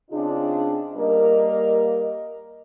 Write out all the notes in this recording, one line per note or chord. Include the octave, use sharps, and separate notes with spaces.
C#3 C4 D4 D#4 F4 G#4
G3 A#3 A#4 D#5